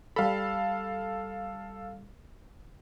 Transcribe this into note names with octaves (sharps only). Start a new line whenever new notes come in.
G3 A4 F5 B5